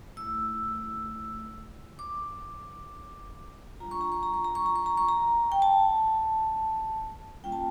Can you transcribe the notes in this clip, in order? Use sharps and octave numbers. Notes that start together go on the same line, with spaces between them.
A3 E4 E6
D6
G3 D4 F4 A#5
C#6
A#5
C#6
A#5
C#6
A#5
C#6
A#5
C#6
A#5
C#6
A#5
G5
A5
G3 A#3 C#4 F4 G5
A5